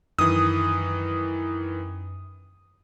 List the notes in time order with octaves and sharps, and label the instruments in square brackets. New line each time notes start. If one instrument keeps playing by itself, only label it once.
[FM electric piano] F#2 [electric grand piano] D#3 E3 [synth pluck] D#6